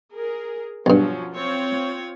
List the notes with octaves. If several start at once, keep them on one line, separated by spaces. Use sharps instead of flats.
G#4 A#4
B1 G2 F3 F#3 C#4
C4 F4 C#5